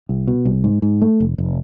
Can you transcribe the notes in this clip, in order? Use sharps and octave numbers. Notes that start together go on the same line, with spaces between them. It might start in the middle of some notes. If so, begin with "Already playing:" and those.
C2
B2
C2
G#2
G#2
A3
F1
F1